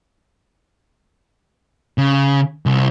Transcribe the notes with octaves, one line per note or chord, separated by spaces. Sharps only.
C#3
C2